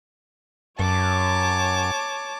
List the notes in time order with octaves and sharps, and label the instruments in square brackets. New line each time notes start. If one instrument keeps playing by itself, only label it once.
[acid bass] F#2 [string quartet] C#5 A5 D6